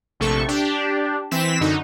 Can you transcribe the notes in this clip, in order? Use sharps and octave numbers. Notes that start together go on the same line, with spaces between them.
A#1 C3 A3 A4 C#6
D4 G4
E3 C4 B6 E7
F#2 D3 D#4 F#4